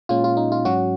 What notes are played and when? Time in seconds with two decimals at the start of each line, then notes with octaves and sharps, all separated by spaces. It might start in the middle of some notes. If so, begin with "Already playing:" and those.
0.09 A#2 G#3 C#4 F4
0.24 F4
0.37 D#4
0.52 F4
0.65 G#2 F#3 C#4 F#4